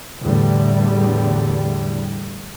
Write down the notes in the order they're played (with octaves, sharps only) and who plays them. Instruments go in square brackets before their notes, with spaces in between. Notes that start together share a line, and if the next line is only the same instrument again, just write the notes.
[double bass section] E2 A2 D3 G3